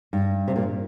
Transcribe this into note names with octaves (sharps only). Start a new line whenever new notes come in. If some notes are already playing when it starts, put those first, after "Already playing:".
G2
C3
A#2